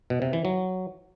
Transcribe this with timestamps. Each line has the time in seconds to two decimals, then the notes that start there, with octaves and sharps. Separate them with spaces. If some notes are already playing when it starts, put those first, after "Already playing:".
0.10 B2
0.22 C3
0.33 E3
0.45 F#3